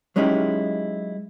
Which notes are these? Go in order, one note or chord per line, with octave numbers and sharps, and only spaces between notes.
F#3 G#3 C#4 D#4 E4 G4